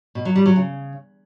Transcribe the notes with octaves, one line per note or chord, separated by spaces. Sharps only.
B2
F#3
G3
F#3
C#3